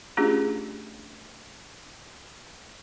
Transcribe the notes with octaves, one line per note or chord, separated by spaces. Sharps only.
A3 C#4 D4 F4 G4 G#4